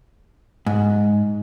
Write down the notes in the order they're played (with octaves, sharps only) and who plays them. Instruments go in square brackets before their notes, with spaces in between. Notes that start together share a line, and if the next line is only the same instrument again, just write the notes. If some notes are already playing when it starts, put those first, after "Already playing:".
[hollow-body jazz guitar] G#2